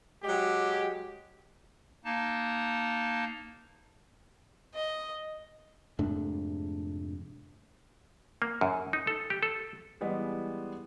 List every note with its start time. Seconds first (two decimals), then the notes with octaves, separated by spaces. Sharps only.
0.23 F#3 G#3 G4
2.04 A#3 D#4 A5
4.74 D#5
5.99 F1 G#2 A3 D4
8.42 A#3
8.61 F#2
8.93 D#4
9.07 A4
9.30 G4
9.43 A4
10.01 E3 G3 G#3 B3